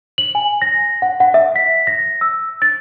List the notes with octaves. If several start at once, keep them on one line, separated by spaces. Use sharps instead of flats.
F#7
G#5
A#6
F#5
F#5
E5
B6
A#6
E6
A6